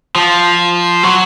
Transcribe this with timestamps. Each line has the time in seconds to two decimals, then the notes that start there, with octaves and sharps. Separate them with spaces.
0.15 F3
1.03 F#3